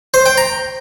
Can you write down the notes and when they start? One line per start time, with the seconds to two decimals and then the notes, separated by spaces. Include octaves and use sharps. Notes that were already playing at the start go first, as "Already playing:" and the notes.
0.14 C5
0.26 G5
0.38 A#5